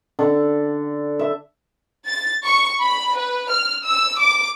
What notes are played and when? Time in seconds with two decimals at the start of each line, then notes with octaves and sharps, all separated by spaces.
0.19 D3
1.19 E5
2.05 A6
2.45 C#6
2.81 B5
3.16 B4
3.50 F6
3.84 E6
4.18 D6